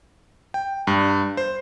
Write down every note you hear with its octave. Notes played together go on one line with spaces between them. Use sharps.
G5
G2
C5